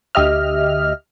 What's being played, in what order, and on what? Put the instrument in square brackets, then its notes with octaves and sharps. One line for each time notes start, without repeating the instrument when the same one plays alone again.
[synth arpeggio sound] D2 G4 D#5 E5 F6